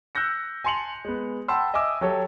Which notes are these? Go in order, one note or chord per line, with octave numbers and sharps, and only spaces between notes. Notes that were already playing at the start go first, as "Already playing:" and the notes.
E6 F#6 G6 A#6 C#7
G#5 A5 C6 C#7 F7 F#7
G#3 B3
F#5 G5 A5 B5 C6 E6
D#5 E5 G#5 D6 E6
F#3 G4 A4 C#5